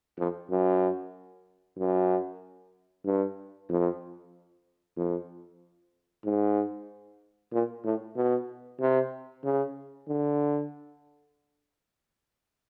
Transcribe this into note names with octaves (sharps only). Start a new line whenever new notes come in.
F2
F#2
F#2
G2
F2
F2
G#2
A#2
A2
B2
C3
C#3
D3